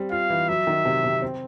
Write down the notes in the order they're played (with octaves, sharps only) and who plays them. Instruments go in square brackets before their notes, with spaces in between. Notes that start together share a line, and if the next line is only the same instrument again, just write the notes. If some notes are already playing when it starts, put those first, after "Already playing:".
Already playing: [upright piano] G3 C4
[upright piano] F4 [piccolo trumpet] F5
[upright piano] E3
[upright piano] F#3 [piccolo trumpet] E5
[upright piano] D#3
C3
C3
C4